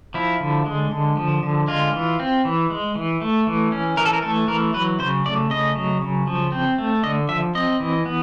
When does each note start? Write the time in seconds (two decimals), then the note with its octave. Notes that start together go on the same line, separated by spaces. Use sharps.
0.14 F3 E4
0.40 D3
0.66 G#3
0.91 D3
1.17 F3
1.43 D3
1.67 G#3 F4
1.93 E3
2.20 C4
2.45 E3
2.70 G#3
2.96 E3
3.21 A3
3.47 E3
3.72 C#4
3.97 E3 A#4
4.06 A4
4.13 A#4
4.22 A3 A4
4.48 E3 A#4
4.74 F#3 B4
4.99 C#3 C5
5.26 A3 D5
5.51 C#3 D#5
5.76 F#3
6.02 C#3
6.27 F3
6.52 C4
6.78 A3
7.03 D3 D#5
7.29 F3 E5
7.55 C4 D#5
7.80 E3
8.06 B3